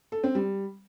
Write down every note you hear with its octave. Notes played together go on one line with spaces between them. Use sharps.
A4
C4
G3